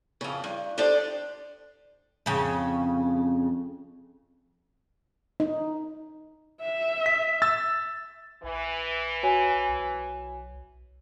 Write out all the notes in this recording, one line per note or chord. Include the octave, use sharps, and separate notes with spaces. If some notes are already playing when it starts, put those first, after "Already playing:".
F2 C#3
G2
D4 G4 A4 C5 D5 D#5
F2 C#3
D#4
E5
B6
E6 A6
A#1 E3
F#4 C#5 G#5
B1